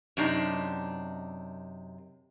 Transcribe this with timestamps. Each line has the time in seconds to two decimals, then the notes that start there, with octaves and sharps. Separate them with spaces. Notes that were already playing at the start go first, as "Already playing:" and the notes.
0.17 F#2 C3 D4 D#4